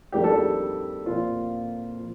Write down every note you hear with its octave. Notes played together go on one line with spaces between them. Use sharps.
F2 D#3 G3 A#3 D4 G4
A4
G4
A#2 F3 C4 F4
F3